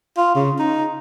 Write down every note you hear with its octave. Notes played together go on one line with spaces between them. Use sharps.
F4
C#3
D#4